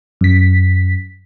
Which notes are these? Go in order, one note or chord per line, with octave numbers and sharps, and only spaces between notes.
F#2 B6